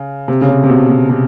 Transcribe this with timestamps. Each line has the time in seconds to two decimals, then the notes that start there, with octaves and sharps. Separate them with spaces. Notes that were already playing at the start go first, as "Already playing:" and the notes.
Already playing: C#3
0.28 C3
0.41 C#3
0.49 C3
0.64 C3
0.69 B2
0.89 B2
1.09 C3